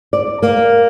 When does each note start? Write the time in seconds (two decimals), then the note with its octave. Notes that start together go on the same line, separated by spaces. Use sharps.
0.13 D5
0.42 A#3